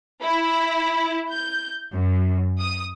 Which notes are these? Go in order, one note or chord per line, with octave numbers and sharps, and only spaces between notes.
E4
G6
F#2
D#6